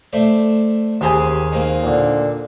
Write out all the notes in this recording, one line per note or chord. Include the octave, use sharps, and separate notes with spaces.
A3 C5 D5
D#2 C4 G4 G#4 C5 G#5
A#3 C4 D#4
A#2 D3